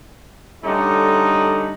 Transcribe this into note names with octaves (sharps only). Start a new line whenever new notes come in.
D3 G3 A3 C#4 D#4